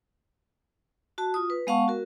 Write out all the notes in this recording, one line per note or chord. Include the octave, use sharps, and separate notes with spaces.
F#4 A5
F4 D#6
B4
G#3 B3 F5 F#5 A5 C#6
F#4 A#4